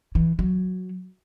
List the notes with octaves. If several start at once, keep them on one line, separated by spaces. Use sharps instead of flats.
E3
F#3